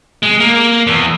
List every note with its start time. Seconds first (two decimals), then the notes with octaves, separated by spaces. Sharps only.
0.23 G#3
0.40 A#3
0.87 E2